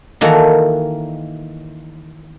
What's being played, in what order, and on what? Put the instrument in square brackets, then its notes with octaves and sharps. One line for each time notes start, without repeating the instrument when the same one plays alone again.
[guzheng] D#3 E3 A#3 F#4 A4